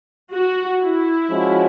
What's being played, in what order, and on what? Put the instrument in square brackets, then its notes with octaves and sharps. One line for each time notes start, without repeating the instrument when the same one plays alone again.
[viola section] F#4
E4
[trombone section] F3 G#3 C#4 F#4